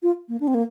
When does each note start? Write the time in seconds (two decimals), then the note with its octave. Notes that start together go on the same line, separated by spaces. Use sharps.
0.03 F4
0.29 A#3
0.40 D4
0.47 C4
0.54 A#3